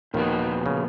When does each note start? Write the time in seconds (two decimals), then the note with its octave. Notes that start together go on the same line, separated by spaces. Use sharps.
0.14 D#2 A#2 D#3 F3 B3 F#4
0.66 C#3